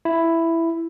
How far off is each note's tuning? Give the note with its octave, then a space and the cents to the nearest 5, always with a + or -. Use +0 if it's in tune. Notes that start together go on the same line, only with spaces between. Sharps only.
E4 +5